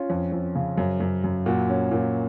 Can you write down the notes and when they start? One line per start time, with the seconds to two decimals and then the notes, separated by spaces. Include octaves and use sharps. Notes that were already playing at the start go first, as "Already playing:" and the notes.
Already playing: C#4 F4
0.10 F2
0.32 F2
0.55 C#3
0.78 F#2
1.00 F#2
1.24 F#2
1.46 A#2 F#4
1.69 C#4
1.91 A#2